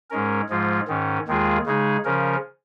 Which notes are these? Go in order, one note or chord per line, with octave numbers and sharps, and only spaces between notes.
G#2 G#3 C#4 A#4
G#2 F3 G#3 F4
G#2 D#3 C#4
D#2 D#3 G#3 F4 G#4
C#3 G#3 D#4 G#4
C#3 F3 C#4 A#4